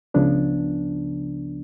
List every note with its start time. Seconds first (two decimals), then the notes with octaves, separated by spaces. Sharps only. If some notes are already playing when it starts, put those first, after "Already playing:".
0.14 C#2 C#3 F3 B3 D4